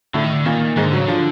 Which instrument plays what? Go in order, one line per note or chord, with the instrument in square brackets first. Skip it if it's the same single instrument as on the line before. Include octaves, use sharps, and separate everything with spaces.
[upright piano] A2 A3 [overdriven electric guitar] D3
[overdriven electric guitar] D#3
D3
[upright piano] A#2 A#3 [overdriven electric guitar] D#3
[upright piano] G#2 G#3 [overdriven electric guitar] D#3
[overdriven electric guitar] D3
[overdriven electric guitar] C#3 [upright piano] F#3
[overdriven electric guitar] D3 [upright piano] F3